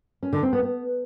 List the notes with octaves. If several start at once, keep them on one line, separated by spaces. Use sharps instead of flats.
C#4
D3
C4
B3
B3